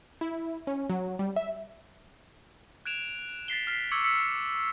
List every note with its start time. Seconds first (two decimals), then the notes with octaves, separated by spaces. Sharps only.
0.21 E4
0.67 C#4
0.90 F#3
1.19 G3
1.36 E5
2.86 F#6 G#6 D7 E7 F7
3.48 A6 B6 C7 G7
3.67 F6 B6 C7
3.91 C#6 D6 E6 G#6 C#7
4.04 E6 B6 C#7